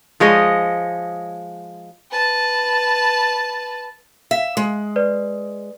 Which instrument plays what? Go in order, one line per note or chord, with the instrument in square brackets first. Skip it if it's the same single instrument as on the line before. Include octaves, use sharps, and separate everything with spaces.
[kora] F3 G#3 C#5 D#5
[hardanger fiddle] B4 A5
[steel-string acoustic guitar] E5 [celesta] F5 B6
[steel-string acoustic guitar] G#3
[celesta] B4 D5